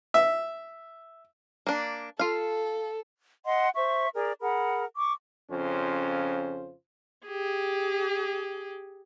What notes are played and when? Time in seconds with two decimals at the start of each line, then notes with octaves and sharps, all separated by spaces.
0.14 E5
1.67 A#3 D4
2.19 F4 A4 F5
3.46 D#5 F#5 C6
3.76 C5 E5 C#6
4.15 G#4 A#4 D5
4.41 G#4 A#4 F#5 B5
4.96 C#6 D6
5.51 F2 C#3 C#4 F4 C5
7.27 G4 G#4